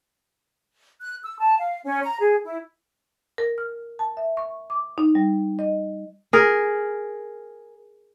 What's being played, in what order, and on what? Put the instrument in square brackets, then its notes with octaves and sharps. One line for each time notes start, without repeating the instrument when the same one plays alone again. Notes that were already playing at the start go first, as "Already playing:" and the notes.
[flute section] F#6
E6
A5
F5
C#4
A#5
G#4
E4
[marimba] A#4
F6
A5
E5
C#6
D6
D#4
G3
D#5
[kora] G#4 A#4